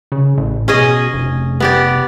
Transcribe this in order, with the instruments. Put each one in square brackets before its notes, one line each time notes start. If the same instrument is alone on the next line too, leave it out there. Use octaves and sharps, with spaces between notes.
[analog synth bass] C#3
A1
[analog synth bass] B2 [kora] C#4 G#4 D#5
[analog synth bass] F1
[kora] B3 G4 D5